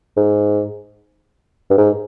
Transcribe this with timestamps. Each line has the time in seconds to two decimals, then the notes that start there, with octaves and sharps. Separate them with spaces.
0.17 G#2
1.70 G2
1.78 G#2